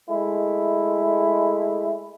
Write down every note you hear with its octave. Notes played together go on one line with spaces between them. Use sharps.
G#3 A3 E4